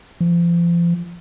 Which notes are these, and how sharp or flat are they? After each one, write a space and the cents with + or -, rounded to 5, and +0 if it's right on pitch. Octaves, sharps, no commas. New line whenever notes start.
F3 -35